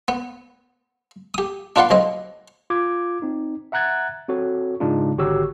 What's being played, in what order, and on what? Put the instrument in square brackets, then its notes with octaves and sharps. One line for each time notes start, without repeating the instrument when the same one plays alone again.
[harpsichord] B3
G4 D#6
D4 F4 B4 D5 F#5 C6
B1 C4 D#5
[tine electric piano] F4 D6 G#6
C4 D#4
E5 F#5 A#5 F#6 G#6 A6
C4 F#4 A4 C#5
G#2 C#3 G#3 D4 D#4 F4
G#1 D3 F#4 G4 C#5 E6